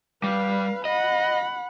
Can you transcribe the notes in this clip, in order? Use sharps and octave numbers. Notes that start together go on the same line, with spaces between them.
G3 B4 F5
D#5 F#5 B5